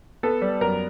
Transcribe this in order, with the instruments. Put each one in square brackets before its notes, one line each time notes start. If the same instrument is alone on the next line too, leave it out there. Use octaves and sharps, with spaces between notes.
[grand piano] B3 [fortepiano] A4
[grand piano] G3
[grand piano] F#2 [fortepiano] A#4